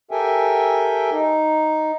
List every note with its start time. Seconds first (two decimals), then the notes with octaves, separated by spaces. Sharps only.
0.11 G4 A4 A#4 E5 G5 G#5
1.12 D#4